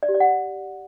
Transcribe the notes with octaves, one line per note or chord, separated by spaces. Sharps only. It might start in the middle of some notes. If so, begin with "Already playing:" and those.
D5
G4
D5
F#5